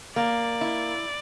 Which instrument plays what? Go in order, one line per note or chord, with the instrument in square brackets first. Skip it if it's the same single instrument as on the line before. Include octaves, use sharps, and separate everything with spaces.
[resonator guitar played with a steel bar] A#3 [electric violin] D5
[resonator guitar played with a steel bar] E4